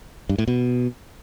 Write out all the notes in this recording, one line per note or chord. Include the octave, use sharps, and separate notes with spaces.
G2
A2
B2